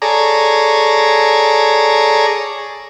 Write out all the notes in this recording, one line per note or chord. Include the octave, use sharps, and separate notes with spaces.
G#4 A4 C#5 D5 A#5